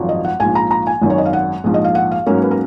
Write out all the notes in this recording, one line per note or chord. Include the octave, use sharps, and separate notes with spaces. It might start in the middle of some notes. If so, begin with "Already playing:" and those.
Already playing: G#1 F#2 F3
D#5
F#5
A#1 G#2 F3 G#5
A#5
A#5
G#5
G#1 F#2 D#3 F#3
C#5
D#5
F5
F#5
A#1 G#2 F3
D#5
F5
F#5
F5
G#2 F#3 A#3 C#4 C#5
B4
A#4